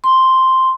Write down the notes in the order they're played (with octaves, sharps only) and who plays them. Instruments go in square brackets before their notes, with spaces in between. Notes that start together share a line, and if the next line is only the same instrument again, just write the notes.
[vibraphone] C6